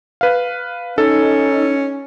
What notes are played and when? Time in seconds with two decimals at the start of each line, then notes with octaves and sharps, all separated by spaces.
0.21 B4 F5
0.98 C#4 D#4 A4